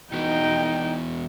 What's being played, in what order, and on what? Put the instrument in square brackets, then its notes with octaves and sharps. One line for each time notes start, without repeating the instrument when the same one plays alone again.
[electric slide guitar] E3 B3 F#4 [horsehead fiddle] D#4 G5